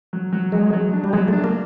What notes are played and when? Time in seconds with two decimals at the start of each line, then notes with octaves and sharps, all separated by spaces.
0.13 F#3
0.33 F#3
0.52 F#3 G#3
0.73 F#3
0.93 D4
1.04 G3
1.13 F#3 G#3
1.28 A3
1.33 D4
1.44 A#3